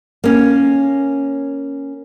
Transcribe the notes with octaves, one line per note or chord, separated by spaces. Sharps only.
A#3 C#4